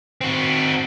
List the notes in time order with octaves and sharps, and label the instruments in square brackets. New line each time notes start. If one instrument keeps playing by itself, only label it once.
[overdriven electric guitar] C4 F#4